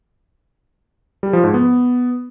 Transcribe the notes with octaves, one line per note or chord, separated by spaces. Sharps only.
G3
F3
G#2
B3